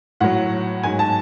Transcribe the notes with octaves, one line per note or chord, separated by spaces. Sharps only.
A2 F#3 F#5
G#2 F#3 G#5
A5